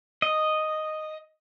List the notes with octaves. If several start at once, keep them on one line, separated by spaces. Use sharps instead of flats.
D#5